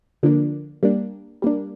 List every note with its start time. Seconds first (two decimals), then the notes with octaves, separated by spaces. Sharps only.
0.23 D3 F3 A#3 D4
0.83 G3 A#3 D4
1.42 G3 A#3 D4